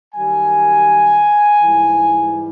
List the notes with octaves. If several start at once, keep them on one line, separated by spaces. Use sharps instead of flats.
F#2 D#3 G3 G#5
G#2 E3 G3